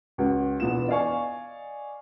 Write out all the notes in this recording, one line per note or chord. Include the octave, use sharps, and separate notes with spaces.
C#2 F#4
E1 E2 B3 F4 E7
D5 D#5 F5 G#5 C#6